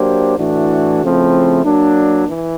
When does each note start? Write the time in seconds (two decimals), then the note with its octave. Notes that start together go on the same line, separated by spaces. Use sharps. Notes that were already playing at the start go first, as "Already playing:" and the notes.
Already playing: F#3 A#3 D4 G4 C5
0.38 A2 E3 A3 D4 F#4
1.01 C#3 F3 A3 C4 E4
1.64 F#3 A#3 D4
2.28 E3